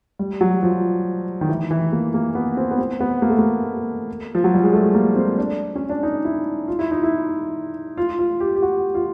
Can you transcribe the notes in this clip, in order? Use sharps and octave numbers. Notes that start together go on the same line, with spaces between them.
G3
F#3
F3
D#3
E3
E3
A#3
A#3
B3
C4
B3
C4
B3
A#3
A3
A#3
F3
F#3
G3
G#3
A3
A#3
C4
D4
C#4
D4
D#4
E4
F4
E4
D#4
E4
F4
F4
G4
G4
F#4
F4